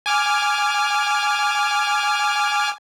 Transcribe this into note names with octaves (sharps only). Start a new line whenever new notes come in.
G#5 D6 F6